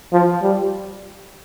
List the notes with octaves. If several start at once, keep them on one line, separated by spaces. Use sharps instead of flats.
F3
G3